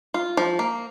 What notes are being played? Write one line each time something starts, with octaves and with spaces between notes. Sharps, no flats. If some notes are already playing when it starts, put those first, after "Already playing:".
F4
F3
A#3